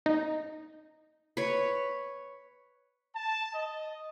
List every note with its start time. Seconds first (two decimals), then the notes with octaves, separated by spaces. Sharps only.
0.06 D#4
1.37 B4 C#5
3.14 A5
3.53 D#5